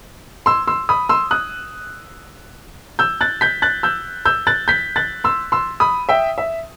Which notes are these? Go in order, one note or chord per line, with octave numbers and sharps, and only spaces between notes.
C6 E6
C6 E6
B5 D#6
C6 E6
D#6 F#6
E6 G6
F#6 A6
G6 B6
F#6 A6
E6 G6
E6 G6
F#6 A6
G6 B6
F#6 A6
C6 E6
C6 E6
B5 D#6
E5 G5
E5